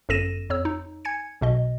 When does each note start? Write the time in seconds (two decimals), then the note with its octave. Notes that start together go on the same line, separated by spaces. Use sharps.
0.09 G1 F#2 A4 A#6 D#7 E7
0.50 F2 C#5 E6
0.65 D#4
1.05 G#5 G#6 C#7
1.41 B1 B2 D#5